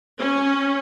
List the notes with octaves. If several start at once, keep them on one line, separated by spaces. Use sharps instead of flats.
C#4